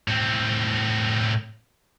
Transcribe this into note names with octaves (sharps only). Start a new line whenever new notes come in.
A2 C4